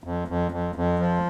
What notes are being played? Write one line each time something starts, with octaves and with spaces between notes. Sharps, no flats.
F2
F2
F2
F2
F3